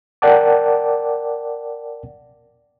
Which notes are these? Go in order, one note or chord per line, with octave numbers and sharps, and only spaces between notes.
A#4 D5 F#5 G5 A5 D6